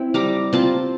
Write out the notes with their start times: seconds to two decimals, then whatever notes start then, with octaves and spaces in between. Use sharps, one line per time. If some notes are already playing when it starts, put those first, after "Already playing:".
Already playing: C4 E4 G5
0.14 G3 A#5 D6
0.53 C4 F4 A5 C6